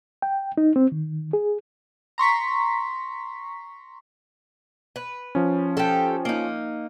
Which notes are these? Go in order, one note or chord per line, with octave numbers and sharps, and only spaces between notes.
G5
D#4
C4
D#3
G#4
A#5 C6 C#6 B6
B4
F3 C#4
G4 A4
A#3 D#4